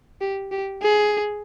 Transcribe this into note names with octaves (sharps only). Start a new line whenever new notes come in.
G4
G4
G#4